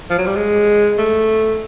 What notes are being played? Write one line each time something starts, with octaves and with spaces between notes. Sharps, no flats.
F3
F#3
G3
G#3
A3